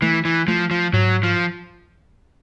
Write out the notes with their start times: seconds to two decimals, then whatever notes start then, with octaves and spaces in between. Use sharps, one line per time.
0.02 E3 A3
0.25 E3
0.48 F3 A3
0.71 F3
0.93 G#2 F#3
1.23 F3